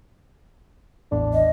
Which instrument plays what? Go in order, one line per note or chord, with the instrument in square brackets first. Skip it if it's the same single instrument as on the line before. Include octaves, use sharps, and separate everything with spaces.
[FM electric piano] A1 E2 [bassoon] D4
[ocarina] D#5